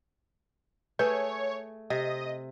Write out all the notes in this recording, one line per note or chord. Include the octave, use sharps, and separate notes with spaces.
A3 G#4 B4 C#5
C3 D#5